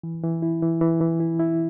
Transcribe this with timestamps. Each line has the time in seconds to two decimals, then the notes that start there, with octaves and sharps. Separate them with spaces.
0.03 E3
0.24 E3
0.42 E4
0.62 E3
0.81 E3
1.00 E3
1.20 E4
1.40 E4